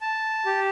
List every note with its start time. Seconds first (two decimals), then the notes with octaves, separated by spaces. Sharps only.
0.01 A5
0.46 G4